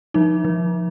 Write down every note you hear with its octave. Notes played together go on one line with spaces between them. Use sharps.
F3 D#4
F3